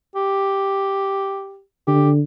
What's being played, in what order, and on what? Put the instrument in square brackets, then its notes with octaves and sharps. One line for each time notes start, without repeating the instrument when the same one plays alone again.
[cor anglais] G4
[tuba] D3 [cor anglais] G4